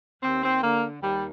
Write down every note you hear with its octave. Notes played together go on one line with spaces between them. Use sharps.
D#2 C4
C4
D3 A#3
D#2 G3